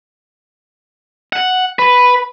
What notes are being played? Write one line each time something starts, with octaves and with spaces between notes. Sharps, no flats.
F#5
B4